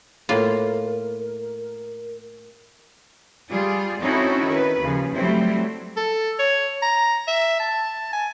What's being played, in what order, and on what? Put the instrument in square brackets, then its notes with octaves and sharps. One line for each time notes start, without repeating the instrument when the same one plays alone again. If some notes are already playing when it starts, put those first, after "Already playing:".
[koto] A2 A#3 F4 [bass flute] A#4
[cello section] G3 F4 G#4
C4 C#4 D#4 E4 F#4 A4
D#3 B4
D#2 C#3 F3
F#3 G3 A3 C4 E4 C5
[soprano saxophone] A4
C#5
A#5
E5
A5
G#5